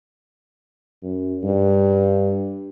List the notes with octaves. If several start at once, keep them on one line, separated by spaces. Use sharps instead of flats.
F#2
G2